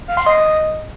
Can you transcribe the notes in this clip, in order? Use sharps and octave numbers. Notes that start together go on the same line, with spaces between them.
F5
C6
D#5